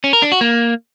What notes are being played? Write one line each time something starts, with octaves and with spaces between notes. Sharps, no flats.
C#4
A#4
D4
F#4
A#3